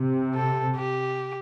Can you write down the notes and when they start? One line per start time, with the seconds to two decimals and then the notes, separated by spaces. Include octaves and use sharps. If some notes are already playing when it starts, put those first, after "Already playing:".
Already playing: C3
0.35 A4
0.76 G4